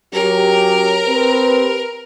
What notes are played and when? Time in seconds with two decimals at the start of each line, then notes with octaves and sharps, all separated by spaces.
0.13 F#3 C#4 G4 A#4
1.06 C4 G4 B4